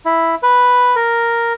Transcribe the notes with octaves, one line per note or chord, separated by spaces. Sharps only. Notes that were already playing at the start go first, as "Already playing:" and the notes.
E4
B4
A#4